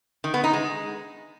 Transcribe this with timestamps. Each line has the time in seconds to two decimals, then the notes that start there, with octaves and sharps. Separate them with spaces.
0.24 D#3
0.34 B3
0.44 D#4
0.53 G#3